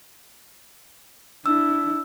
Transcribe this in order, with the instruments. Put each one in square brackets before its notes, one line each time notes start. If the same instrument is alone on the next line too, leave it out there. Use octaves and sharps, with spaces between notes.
[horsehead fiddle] D4 E4 [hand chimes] E6